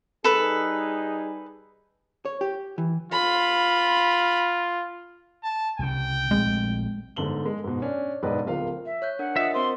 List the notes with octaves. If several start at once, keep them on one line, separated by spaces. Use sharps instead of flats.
G3 D#4 G#4 A4 B4
C#5
G4
E3
F4 B5
A5
C2 C#3 G5
A#1 G#3 A3 C4
G1 G#2 A4 F#7 G7
G#3
G#2 B2
C#4 D4
E1 G#2 B4 D5 D#5
D1 F4 A#4 F5
E5
C#5 F#6 G6
D4 A#4 F#5
F4 D#5 E5 D#6
C4 A#4 C5 C6